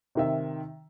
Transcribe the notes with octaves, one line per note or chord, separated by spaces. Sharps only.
C3 D#3 E5